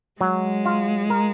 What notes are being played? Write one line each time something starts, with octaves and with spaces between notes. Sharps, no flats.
F#3 G#3
F4
A#4